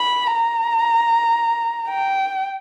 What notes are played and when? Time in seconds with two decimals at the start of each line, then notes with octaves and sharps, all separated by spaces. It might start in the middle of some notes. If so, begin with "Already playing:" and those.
Already playing: B5
0.35 A#5
1.89 G5